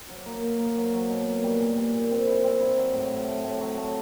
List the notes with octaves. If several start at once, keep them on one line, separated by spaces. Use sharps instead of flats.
F#3
A#3
A#3
A#3
F#3
F#3
B2
A#3
G3
A#2
G3
A#2
C4
E4
C4
E4
F#3
A2
A2
A3
A2
F#3
A3